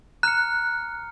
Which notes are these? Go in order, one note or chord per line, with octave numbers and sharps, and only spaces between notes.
A#5 F6 F#6 C#7